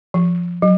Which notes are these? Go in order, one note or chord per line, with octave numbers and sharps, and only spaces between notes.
F3
F#3